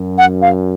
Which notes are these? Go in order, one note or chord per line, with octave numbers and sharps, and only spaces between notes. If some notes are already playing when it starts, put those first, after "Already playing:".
Already playing: F#2
F#5
F5